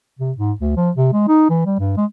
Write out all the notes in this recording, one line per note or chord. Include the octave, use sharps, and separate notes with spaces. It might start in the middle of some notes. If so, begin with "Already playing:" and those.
C3
G#2
D2
F3
C3
G#3
D#4
E3
G3
G2
G#3